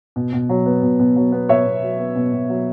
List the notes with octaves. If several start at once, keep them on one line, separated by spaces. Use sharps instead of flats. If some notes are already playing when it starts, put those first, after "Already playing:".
B2
B2
F#3
B3
B2
B2
F#3
B3
B2 C#5 E5
B2
F#3
B3
B2
B2
F#3